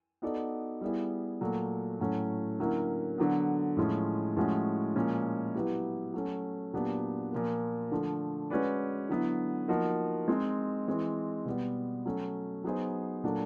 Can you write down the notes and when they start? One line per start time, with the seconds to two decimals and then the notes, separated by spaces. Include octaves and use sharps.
0.22 B3 D#4 F#4 A4 D5
0.81 G3 B3 E4 G#4
1.41 A#2 F#3 A3
2.00 A2 F#3 A3 C#4
2.59 D3 F#3 A#3 C#4 E4
3.18 D3 F#3 B3
3.77 A2 F3 G#3 C#4 F4
4.36 A2 F3 G#3 C#4 F#4
4.96 A#2 F3 G#3 C#4
5.54 F#3 B3 E4 G4 B4
6.14 F#3 A3 C#4
6.73 A#2 F#3 B3 D4 G4
7.32 A#2 F3 A#3
7.91 D3 F3 A3
8.50 G#3 C#4 F#4 B4 D5
9.09 D3 F#3 B3 E4
9.68 F3 A#3 D#4 F#4
10.28 G#3 C4 D#4
10.88 E3 G#3 C4
11.46 B2 G3 B3
12.05 F#3 A3 C#4
12.64 F#3 B3 D#4 G#4 C5
13.24 A#2 F#3 A3 D4